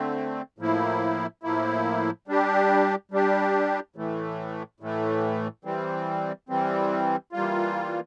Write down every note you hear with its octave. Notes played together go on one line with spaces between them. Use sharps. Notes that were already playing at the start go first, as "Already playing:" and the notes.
Already playing: D3 A3 C4
A2 F3 A#3 E4
A2 F3 A#3 E4
G3 D4 G4
G3 D4 G4
A2 E3 A3
A2 E3 A3
E3 G3 C4
E3 G3 C4
E3 G3 A#3 F4